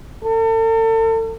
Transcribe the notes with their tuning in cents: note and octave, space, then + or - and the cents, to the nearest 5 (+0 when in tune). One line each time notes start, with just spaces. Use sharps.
A4 +40